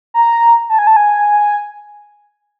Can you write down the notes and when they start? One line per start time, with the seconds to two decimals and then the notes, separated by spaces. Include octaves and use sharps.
0.14 A#5
0.70 A5
0.79 G#5
0.87 A5
0.97 G#5